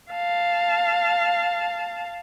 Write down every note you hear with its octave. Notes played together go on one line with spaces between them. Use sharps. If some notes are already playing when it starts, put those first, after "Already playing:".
F5 A5